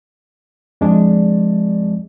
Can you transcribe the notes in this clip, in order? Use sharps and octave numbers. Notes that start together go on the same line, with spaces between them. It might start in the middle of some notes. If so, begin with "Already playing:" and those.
F2 G#3 D4